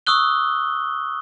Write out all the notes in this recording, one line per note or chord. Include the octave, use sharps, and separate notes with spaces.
C#6 D#6 E6 F#6 G7